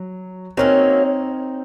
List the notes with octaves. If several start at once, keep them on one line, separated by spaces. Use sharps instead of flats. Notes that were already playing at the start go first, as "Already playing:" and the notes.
Already playing: F#3
F#3 A#3 C4 C#4 D#4